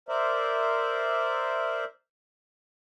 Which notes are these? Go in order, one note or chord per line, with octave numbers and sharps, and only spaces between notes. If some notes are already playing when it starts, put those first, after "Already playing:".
A#4 C5 D5 E5